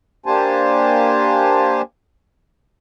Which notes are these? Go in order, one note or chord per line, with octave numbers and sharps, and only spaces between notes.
A#3 D4 G4 C5 G#5 A5